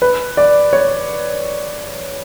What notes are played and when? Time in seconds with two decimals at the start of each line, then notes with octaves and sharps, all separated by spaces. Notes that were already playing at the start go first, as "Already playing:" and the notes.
0.02 B4
0.37 D5
0.73 C#5